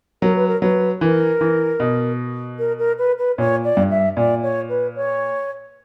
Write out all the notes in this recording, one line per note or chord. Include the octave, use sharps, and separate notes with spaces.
F#3 A#4
B4
A#4
F#3 B4
E3 A#4
E3
B2
A#4
A#4
B4
B4
A#2 C#5
D5
G2
E5
A#2 D5
C#5
B4
C#5